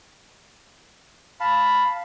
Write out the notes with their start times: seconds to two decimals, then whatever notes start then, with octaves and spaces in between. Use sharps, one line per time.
1.40 F5 A5 B5